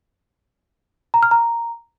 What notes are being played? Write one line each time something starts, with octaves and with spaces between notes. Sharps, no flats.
A#5
F6
A#5